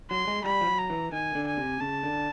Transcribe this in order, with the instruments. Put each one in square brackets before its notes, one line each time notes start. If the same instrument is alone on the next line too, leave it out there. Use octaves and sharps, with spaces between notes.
[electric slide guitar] F#3 [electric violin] C6
[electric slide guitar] G#3
[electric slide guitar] G3 [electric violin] B5
[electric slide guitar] F3
F#3
[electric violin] A#5
[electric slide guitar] E3
[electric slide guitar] D#3 [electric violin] G#5
[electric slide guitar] D3
[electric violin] G#5
[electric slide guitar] C3
[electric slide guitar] C#3 [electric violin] A5
[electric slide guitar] D3